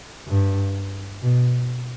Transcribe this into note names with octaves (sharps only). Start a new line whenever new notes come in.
G2
B2